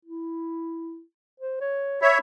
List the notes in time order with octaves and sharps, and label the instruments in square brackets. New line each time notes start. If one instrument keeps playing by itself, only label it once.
[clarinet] E4
C5
C#5
[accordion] C#5 E5 [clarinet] B5